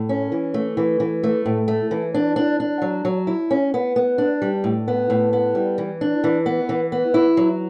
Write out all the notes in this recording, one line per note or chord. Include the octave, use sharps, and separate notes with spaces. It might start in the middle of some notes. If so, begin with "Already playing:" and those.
Already playing: A2
C#4
E3
A3
E3
E3
A3
A2
A3
E3
D4
D4
D4
F#3
F#3
E4
C#4
B3
B3
D4
G3
A2
B3
A2
B3
G3
E3
D4
E3
B3
E3
B3
E4
F#3